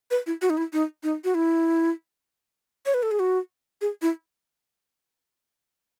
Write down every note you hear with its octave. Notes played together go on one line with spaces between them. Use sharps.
B4
E4
F#4
D#4
E4
D#4
D#4
F#4
E4
C#5
B4
A4
G#4
F#4
G#4
E4